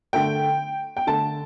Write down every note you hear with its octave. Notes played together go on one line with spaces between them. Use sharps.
D3 A3 G5
G5
D3 A3 A5